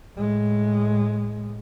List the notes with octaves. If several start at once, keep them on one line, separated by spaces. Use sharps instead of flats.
A2 G#3